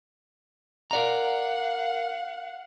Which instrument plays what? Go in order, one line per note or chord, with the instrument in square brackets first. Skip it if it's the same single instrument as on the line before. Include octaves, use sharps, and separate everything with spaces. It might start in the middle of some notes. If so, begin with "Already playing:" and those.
[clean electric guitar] A#4 D5 A#5 [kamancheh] F5 F#5